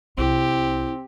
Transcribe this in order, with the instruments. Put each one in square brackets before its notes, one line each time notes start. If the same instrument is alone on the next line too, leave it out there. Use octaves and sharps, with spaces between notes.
[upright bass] C2 [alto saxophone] C4 [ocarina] E4 [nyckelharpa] G4